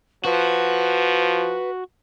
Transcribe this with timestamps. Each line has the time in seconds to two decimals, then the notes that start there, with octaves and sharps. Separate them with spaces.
0.25 F3 F#4 B4